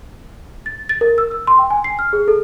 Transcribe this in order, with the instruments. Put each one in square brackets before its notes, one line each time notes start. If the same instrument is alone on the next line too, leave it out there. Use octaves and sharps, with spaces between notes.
[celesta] A6
A6
A#4
E6
E6
C6
G5
G#5
C7
F6
G#4
A4